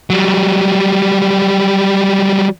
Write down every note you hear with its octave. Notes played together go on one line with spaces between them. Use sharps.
F#3 G3